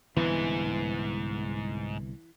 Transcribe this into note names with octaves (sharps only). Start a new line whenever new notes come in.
C2 G#2 D3 E3 B3